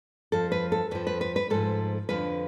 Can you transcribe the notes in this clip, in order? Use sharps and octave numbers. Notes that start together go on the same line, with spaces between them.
F2 F3 A4
B4
A4
F2 F3 B4
B4
B4
B4
G#2 F3 A4
F2 D3 F3 B4